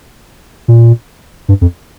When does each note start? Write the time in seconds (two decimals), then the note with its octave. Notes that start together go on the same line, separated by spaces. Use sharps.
0.68 A#2
1.49 G2
1.61 F2